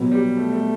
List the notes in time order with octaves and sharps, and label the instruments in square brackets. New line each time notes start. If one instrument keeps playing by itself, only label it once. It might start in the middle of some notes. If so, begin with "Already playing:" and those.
Already playing: [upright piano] B2 F#3 B3
[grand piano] G3
A3
A3